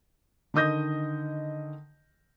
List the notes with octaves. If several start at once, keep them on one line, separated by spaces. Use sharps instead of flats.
D3 D#3 D#5 D#6 G6 A#6